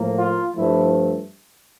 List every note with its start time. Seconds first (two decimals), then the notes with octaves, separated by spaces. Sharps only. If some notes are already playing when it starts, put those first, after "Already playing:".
Already playing: A2 F3 A#3
0.18 F4
0.55 G2 F3 A3 E4